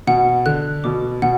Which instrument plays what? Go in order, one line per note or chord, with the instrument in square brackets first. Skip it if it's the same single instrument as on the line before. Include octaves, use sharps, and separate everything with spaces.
[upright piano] B2 [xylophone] F#5
[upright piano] D3 [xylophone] F#6
[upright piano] B2 [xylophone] D6
[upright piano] B2 [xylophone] F#5